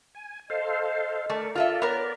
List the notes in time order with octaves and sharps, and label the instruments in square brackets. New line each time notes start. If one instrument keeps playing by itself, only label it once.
[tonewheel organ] G#5
[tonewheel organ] A4 C5 F5 [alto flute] D#5
[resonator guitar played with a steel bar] A3 [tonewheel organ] A#4 D5
[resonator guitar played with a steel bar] F4 A4 E5 [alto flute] F5
[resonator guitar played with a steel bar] B3 A#4 [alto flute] C#5 [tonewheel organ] D5